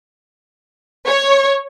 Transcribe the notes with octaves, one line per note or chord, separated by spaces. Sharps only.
C#5